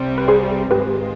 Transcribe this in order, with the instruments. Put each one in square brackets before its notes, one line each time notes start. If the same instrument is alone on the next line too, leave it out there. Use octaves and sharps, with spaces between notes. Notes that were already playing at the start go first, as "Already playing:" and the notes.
Already playing: [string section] C2 C3 G3 C4
[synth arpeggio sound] B4
G#4 C5
[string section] G#2 D#3 G#3 C4 F4 [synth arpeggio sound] G4 B4